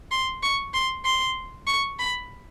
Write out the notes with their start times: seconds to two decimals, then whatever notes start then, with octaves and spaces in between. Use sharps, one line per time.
0.11 C6
0.43 C#6
0.74 C6
1.05 C6
1.67 C#6
1.99 B5